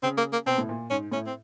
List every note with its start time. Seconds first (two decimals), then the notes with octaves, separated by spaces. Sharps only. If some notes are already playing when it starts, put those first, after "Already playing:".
0.03 C#3 C4
0.17 A#3
0.32 A#3
0.46 B2 C4
0.58 A2
0.69 A#2
0.90 G#2 C#4
1.12 A2 C#4
1.26 C4